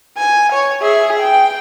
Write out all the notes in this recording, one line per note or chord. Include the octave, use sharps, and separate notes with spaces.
G#5
C#5
G#4 E5
G5